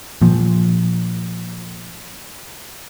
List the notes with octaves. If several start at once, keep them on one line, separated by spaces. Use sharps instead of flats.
A#2 F3